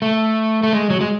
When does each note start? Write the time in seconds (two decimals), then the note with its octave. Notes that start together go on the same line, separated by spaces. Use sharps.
0.02 A3
0.63 A3
0.73 G#3
0.90 F#3
1.01 G#3